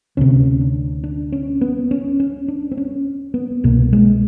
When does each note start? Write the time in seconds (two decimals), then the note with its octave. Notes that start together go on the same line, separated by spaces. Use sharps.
0.17 D2 C3 C#4
0.61 D4
1.04 D4
1.32 C#4
1.61 B3
1.91 C#4
2.20 C#4
2.48 D4
2.71 C4
2.77 C#4
3.34 B3
3.64 C2 B2 A#3
3.93 G#3